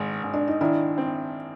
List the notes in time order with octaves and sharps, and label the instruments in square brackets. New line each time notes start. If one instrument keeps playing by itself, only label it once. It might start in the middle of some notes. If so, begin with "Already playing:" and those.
Already playing: [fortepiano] G#1 D#3
G#1
[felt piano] D4
D#4
[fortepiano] D#3 [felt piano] D4 E4
[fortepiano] C4